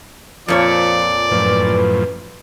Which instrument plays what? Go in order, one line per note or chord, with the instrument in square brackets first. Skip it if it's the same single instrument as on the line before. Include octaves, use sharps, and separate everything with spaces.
[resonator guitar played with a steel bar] F2 A#2 C#5 [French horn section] F3 [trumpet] D5
[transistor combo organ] F#2 A2 F3 [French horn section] B4